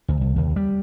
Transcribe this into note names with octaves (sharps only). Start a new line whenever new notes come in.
D2
C2
D#2
G3